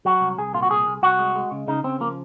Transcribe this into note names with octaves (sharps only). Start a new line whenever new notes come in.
F#3 F#4
C2
C2 G#4
A#2 F4
F#4
C2 G#4
C2
C2 F#4
G#3
G#3
C#3
C#3 D#4
C#3 C4
F3 A#3